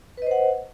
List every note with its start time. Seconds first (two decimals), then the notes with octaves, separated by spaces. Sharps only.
0.17 B4
0.22 D#5
0.27 C5
0.31 F#5